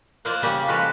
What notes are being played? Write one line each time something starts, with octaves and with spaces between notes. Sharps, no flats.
A#3 F4 C5 D5 D#5 F#5
C#3 G3 A#3 G4
F3 G#3 F4 F#4 A4 B4